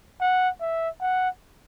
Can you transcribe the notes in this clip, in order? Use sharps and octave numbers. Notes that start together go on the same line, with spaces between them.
F#5
E5
F#5